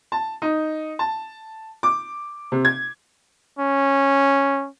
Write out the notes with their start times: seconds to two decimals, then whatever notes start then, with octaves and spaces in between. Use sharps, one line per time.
0.12 A5
0.42 D#4
0.99 A5
1.83 D6
2.52 C3
2.65 G#6
3.59 C#4